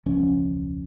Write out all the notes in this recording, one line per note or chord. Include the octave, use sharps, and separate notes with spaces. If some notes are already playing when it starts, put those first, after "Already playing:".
E1 C#2 F3 C#4